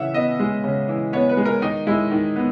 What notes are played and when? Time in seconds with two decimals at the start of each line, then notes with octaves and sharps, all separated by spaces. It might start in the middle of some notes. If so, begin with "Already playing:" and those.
Already playing: C#3 E3 E5 F#5
0.14 B3 D#5
0.39 G#3
0.64 C#3
0.89 E3
1.13 B3 C#5
1.29 B4
1.37 G#3
1.45 A#4
1.62 D#3 D#4
1.87 G#3 E4
2.11 D#3
2.36 B3